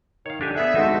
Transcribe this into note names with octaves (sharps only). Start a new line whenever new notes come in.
D#3 C#5 F5
D3 D4 G4 G#5
B3 G#4 A4 E5
G#3 B3 C4 D4 D#4 F#4 A4